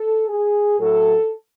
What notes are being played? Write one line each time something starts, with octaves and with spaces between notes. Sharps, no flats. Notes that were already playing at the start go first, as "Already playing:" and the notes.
Already playing: A4
G#4
A2 F#3 A4